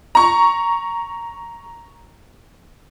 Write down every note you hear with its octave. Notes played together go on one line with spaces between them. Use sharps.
A#5 C#6